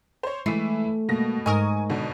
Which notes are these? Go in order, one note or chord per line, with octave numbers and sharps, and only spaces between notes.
C5 C#5
E3 G#3 A3 E4 C7
B2 G#3 A#3 A#6
G#2 G#3 D#4 A#4 D#5 G#5 C#6 D#6
G#1 B2 D3